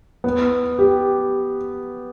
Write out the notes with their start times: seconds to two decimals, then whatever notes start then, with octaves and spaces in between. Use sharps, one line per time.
0.24 B3
0.78 G4